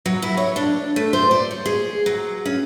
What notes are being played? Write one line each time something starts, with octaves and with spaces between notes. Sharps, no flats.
F#3
E4
C#5
D4
A3
C5
D5
C#5
G#4
F#3
C#4